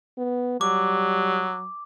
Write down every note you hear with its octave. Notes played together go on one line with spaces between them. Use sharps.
B3
F#3 G3 D6